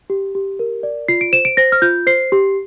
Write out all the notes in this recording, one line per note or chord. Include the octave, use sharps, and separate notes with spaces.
G4
G4
A#4
D5
F4 C7
D7
C5 E7
D7
C5 A#6
F6
F4 G6
C5 C7
G4